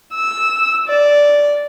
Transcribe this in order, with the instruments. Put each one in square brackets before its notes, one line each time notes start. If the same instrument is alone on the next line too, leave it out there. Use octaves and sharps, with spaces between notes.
[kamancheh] E6
D5